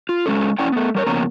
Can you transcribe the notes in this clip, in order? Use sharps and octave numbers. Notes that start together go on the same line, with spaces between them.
F4
G#3 C#4 A4
C#4 E4 D5 F#5 G5
A3 B3
G3 A#4 C#5
F2 C#3 A#3 B3 C#4 A#5